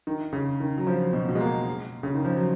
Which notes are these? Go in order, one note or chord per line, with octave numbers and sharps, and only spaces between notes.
D#3
C#3
D#3
F#3
F3
B2
B2
G#3
A#3
C#3
D#3
F3
F#3